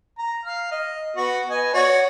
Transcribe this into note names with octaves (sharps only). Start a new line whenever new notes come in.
A#5
F5 F6
D#5
B3 F#4
B3 D#5 G#5
F#4 C#5 D5